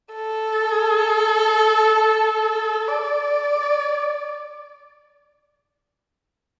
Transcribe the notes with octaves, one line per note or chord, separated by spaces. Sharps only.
A4
D5